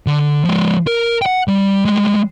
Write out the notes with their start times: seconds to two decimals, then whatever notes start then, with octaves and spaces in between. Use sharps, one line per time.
0.07 D3
0.45 F3 G#3
0.87 A#4
1.22 F#5 G5
1.48 G3
1.85 G3 G#3